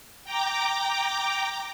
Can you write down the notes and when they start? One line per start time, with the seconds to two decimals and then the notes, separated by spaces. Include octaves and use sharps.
0.24 G5 A#5 D6